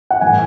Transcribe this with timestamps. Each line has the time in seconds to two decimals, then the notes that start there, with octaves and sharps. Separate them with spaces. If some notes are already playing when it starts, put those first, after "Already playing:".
0.10 F#5
0.21 A2 E3 G#5